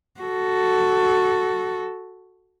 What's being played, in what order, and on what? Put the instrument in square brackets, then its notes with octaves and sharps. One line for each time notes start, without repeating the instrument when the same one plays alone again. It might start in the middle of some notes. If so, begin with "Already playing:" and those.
[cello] F#4 A4